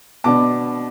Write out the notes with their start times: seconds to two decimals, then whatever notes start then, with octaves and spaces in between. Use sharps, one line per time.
0.24 B2 B3 D4 A5 D6